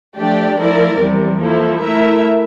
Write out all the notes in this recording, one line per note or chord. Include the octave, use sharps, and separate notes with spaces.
F3 A3 D4 G4 D5
F3 A3 E4 A#4 D5
E2 C3 G3
F3 A#3 E4 A4
A3 E4 A#4 E5